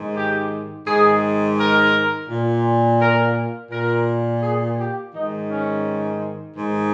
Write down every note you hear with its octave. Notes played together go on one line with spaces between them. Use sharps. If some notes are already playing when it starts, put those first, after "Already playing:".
Already playing: G#2 D#3
G4
G#2 D#3 G#4
A#4
A#2
A#4
A#2 A#4
G#4
G4
G#2 D#3 D#4
C#4
G#2 D#3